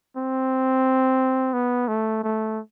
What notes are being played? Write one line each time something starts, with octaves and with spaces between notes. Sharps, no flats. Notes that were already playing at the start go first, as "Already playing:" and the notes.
C4
B3
A3
A3